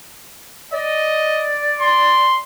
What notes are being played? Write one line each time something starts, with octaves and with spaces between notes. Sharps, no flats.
D5 D#5
C6